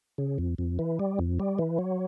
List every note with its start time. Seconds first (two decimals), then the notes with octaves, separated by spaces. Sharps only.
0.18 C#3
0.38 F2
0.58 F2
0.79 E3
0.99 G3
1.19 F2
1.40 G3
1.59 E3
1.79 F#3